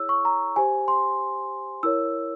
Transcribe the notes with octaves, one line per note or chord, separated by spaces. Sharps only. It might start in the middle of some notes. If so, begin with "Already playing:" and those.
Already playing: E4 G#4 C#5 E6
C#6
A#5
G4 C5 G#5
C6
E4 A#4 C#5 E6